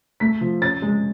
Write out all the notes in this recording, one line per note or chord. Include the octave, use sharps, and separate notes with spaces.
A3 B6
F3
C#4 A6
G#3